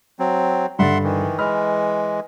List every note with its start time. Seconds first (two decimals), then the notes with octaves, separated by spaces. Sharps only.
0.19 F#3 C4
0.79 G2 D3 E5 F#5 C6 A6
1.04 D#3 E3
1.38 E3 G#3 B5 F6